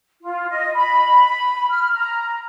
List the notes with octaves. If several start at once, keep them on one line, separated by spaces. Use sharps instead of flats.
F4
D#5
B5
F6
A#5